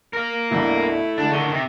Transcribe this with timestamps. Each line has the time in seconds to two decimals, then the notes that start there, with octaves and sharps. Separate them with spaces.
0.13 A#4 F5
0.51 C2 G2 B2 A3 E4
1.18 D3 G#3 D4
1.31 D3 D#3 C#6 D#7 G7
1.53 C3